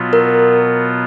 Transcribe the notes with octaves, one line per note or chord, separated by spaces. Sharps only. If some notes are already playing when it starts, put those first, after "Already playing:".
Already playing: B2 F#3 B3 F4
A#4